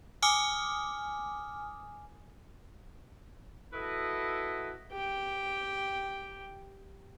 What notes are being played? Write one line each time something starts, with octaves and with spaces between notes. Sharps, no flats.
G#5 D6 D#6 F6
E4 F#4 A4 B4 D#5 E5
G4 G5